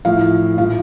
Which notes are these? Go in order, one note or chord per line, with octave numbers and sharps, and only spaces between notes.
A2 F3 F5
A2 F3 F5